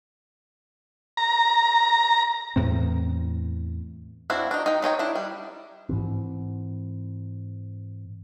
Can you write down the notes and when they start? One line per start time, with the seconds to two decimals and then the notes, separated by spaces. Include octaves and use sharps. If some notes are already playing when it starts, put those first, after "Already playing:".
1.17 A#5
2.56 E2 A2 C4
4.30 C4 D4 E4 F#4 F5
4.51 D4 D#4
4.66 D#4 G5
4.82 F#3 D#4 C#5 G5
4.99 D4 E4
5.15 G3
5.89 G#2 E3 C4